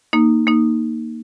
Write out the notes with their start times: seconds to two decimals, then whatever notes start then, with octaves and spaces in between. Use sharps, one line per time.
0.13 A#3 D#4
0.47 A#3 D#4